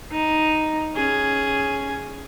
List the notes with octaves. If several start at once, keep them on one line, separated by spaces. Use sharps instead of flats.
D#4
C#4 G#4